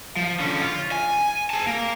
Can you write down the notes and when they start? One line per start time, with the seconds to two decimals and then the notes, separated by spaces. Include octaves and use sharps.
0.16 F3
0.40 D3 C#4
0.62 F4
0.92 G#5
1.50 G#4 A5
1.67 A#3